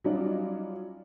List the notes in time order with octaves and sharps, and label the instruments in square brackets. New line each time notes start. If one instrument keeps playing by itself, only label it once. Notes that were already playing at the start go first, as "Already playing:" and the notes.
[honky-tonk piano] F#3 G3 C#4 D#4 F4 D5